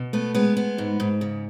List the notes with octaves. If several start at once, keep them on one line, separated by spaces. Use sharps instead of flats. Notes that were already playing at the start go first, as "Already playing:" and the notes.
Already playing: B2
A3 B3 B4
G#3 B3 B4
B3
G#2
G#2
C#3